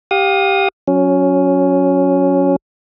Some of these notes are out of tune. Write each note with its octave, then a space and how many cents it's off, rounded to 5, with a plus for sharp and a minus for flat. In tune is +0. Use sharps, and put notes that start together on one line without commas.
G4 +0 F5 +30 D#6 -5
F#3 -20 C#4 +5